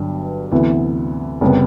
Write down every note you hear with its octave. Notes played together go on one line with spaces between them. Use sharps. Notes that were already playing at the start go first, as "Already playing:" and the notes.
Already playing: G1 G2 F#3 B3 D4
D2 C3 E3 B3 E4
F#1 C3 G3 B3